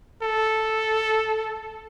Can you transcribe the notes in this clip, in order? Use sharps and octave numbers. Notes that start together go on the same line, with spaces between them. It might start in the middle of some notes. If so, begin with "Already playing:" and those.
A4